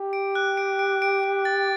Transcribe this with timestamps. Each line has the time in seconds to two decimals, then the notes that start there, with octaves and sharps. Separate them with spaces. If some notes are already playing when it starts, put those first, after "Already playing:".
Already playing: G4
0.13 D7
0.35 F#6
0.57 D7
0.79 D7
1.02 D7
1.24 D7
1.45 A6